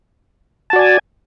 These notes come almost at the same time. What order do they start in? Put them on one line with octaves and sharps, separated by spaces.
A5 F#4 D5 G#5